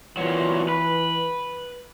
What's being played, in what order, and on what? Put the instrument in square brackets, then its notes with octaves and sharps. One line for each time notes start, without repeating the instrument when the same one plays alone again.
[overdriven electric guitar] A#2 F#3 [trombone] E3
[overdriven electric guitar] B4